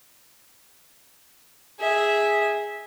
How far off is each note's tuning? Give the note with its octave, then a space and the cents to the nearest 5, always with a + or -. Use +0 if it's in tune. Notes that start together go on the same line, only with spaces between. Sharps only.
G#4 -5 E5 -10